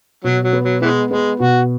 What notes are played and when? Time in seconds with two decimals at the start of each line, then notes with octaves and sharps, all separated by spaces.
0.24 B2 F#3
0.44 F#3
0.53 B3
0.63 F#3
0.82 E3 G#3 B3
1.11 G#3 B3
1.40 B2 F#4